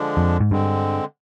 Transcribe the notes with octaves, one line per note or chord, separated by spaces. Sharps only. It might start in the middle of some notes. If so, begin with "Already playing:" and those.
Already playing: D3 F3 G#3 D4
F2
G#2
G2 D3 G#3 C4